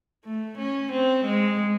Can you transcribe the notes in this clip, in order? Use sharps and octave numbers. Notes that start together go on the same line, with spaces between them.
A3
C#4
C4
G#3